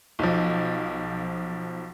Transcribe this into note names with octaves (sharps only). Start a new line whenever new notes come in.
B1 F3